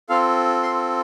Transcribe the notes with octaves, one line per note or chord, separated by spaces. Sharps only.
C4 F4 A4 F5
C6